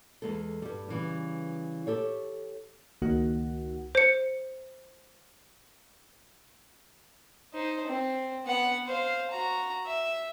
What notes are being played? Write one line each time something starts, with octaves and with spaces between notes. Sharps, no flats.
E2 G#3 A4
G2 G3
C#3 E3 G3
G4 A4 C#5
C#2 D#3 A#3 D#4 F#4 F#5
C5 C#7
D#4 C5
C4
B3 F#5
C5 F5
F#4 A#5
E5